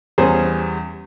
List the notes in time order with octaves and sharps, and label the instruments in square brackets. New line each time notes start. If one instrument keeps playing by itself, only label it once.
[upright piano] E2 G3 C#4 G#4 C5